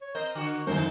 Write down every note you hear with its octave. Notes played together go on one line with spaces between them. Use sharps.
C#5
C4 A#4 C5 D#5
D3 F#4
F#2 D3 D#3 D#4 A#4 C5